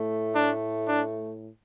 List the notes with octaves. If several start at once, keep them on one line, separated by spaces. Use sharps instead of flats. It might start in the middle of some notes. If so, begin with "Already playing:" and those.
Already playing: A2 A3
D4
D4